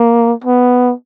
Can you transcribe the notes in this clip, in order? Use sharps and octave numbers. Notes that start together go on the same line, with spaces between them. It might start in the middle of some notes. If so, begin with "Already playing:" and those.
Already playing: A#3
B3